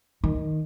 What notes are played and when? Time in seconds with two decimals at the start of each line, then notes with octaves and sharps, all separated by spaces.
0.24 D#3